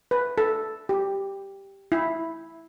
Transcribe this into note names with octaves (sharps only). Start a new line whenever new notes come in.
B4
A4
G4
E4